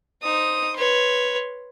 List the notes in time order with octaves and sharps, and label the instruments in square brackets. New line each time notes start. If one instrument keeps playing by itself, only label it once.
[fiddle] D#4 [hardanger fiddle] C5 D#6
[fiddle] B4 C#5 [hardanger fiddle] C6